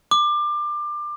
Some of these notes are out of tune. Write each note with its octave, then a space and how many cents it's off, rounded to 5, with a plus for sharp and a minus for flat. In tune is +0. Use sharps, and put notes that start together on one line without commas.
D6 +25